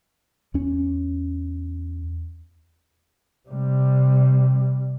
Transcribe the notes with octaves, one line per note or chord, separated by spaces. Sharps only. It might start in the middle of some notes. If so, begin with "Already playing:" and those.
E2 C#4
C3 G3